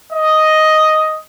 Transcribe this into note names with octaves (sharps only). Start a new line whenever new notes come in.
D#5